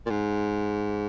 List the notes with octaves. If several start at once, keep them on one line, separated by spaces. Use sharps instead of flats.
A#2
G#2